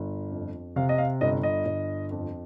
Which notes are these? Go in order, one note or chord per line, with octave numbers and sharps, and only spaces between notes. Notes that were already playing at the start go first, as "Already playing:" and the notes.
Already playing: G1
F2
C3 F5
D#5
F5
G1 D#5
D#5
G1
F2